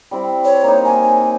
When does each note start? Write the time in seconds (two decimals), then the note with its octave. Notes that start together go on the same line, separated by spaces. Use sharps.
0.11 G3 C4 E4
0.44 C#5
0.64 A#3 D#4
0.85 A#3 G#5